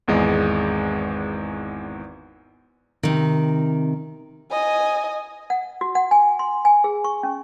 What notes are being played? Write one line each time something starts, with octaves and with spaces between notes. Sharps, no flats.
G#1 E2 G#3 D#5
C3 D#3
D#5 G#5
F#5
F#4
F#5
G#5
C6
G#5
G#4
C#6
C#4